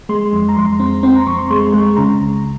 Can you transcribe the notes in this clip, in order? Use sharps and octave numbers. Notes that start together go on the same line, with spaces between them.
G#3 C6
F2
A#5
F2 C6
C4
C4 C6
A#5
F2 C#6
C6
G#3 C6
G#3
C#3 A#5
C#2